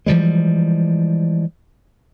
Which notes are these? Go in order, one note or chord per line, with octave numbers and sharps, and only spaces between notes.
E3 F3 G3 G#3